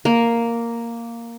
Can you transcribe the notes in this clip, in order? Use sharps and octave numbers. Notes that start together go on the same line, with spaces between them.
A#3